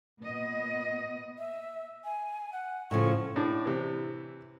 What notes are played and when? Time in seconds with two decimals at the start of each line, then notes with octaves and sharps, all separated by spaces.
0.22 A#2 B3 D#5
1.38 E5
2.04 G#5
2.53 F#5
2.91 A2 C#3 F3 C#6
3.36 A2 D4
3.66 C3 E3